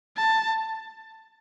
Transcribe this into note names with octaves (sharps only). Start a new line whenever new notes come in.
A5